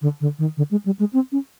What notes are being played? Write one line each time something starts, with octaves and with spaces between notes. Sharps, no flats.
D3
D3
D#3
D3
G#3
G3
G#3
C4
C#4